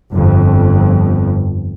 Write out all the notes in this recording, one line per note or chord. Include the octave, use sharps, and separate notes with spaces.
G1 F2